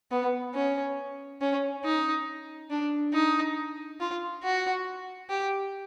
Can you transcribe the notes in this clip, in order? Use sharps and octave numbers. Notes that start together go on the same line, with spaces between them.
B3
C#4
C#4
D#4
D4
D#4
F4
F#4
G4